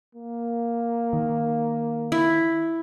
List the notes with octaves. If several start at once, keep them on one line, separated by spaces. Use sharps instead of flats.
A#3
D#3
E4